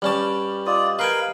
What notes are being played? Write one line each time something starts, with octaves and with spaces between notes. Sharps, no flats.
G2 G3 C#4 D5 A5
F4 D5 D#5
A#4 B4 F5 G5 G#5